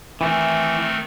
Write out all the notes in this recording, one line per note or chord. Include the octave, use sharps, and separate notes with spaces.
D#3 E3 A3 C4